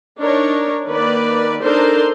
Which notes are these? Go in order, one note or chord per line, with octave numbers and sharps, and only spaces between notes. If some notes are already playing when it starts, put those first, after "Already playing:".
D4 D#4 A#4 C#5
D#3 A#3 B4 D5
D4 D#4 A4 A#4 C5 C6